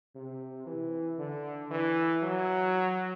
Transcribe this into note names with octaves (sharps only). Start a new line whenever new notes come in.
C3
E3
D3
E3
F#3